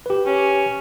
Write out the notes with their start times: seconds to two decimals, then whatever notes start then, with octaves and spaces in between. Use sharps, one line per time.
0.06 G4 B4
0.26 C#4